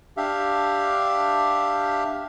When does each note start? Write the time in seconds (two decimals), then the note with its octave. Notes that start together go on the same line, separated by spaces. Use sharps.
0.17 D4 G4 E5 F5